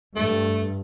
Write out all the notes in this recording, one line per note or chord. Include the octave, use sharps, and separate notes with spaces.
G2 A3